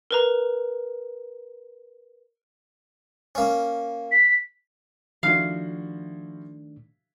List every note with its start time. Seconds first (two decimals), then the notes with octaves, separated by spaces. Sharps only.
0.11 A#4 B4 A#5
3.35 A#3 C#4
4.11 B6
5.23 D#3 F3 A3 D4 E4 F#4 F5